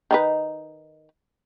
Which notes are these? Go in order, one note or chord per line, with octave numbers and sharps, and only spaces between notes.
D#3 D#4 B4